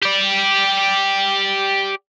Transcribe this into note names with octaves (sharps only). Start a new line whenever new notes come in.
G4 D5